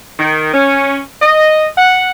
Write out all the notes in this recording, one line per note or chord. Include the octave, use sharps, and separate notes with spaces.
D#3
C#4
D#5
F#5